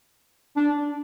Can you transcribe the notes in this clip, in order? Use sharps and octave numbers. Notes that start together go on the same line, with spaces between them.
D4